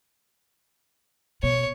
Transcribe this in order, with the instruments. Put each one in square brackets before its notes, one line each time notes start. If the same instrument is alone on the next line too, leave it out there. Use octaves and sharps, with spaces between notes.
[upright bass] B2 [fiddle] C#5